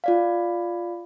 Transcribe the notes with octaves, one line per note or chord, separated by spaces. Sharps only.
F4 D5 F5